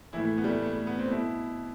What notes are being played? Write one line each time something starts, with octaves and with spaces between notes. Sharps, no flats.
A2 E3 E4
A3
B3
G3
A3
A3
A3
B3
C4
B2 E4